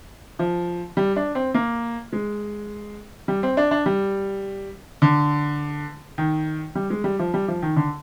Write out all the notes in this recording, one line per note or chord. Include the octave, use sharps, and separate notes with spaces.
F3
G3
D4
C4
A#3
G#3
G3
C4
D4
D4
G3
D3
D#3
G3
G#3
G3
F3
G3
F3
D#3
D3